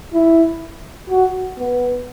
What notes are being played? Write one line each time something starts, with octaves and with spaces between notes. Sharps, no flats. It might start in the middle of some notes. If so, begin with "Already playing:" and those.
E4
F#4
B3